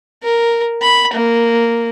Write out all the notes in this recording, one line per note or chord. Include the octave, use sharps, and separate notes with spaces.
A#4
B5
A#3